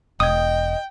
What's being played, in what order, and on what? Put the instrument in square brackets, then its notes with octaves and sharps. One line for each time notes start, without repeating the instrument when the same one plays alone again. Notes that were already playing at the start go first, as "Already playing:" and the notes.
[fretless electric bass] E1 [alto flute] D#5 [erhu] G5 [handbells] D#6 G#6